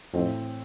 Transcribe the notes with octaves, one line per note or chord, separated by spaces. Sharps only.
F2 A2 E3 A3 C4